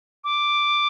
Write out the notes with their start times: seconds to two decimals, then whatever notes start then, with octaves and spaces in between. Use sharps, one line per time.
0.24 D6